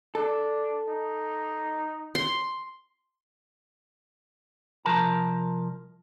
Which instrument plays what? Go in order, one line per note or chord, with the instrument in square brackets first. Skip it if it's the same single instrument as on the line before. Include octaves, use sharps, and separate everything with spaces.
[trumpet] D4 [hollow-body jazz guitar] A4
[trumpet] D#4
[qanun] C6
[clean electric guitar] C2 F2 F3 A#4 A5 A#5